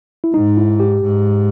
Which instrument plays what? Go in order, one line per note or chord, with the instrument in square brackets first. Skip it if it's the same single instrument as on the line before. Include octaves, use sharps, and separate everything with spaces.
[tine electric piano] E4
[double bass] G#2 [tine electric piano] D#4
[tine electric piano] E4
G4
[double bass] G#2